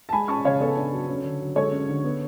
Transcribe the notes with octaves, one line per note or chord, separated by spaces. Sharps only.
A5
G#3 G#5 B5
C#4 A5 C#6
C#3 C#5 F5
B3 A4 C#5
D4
F#3
C#4
D3
F#3
G#3 A4 C#5
C#4
D3
B3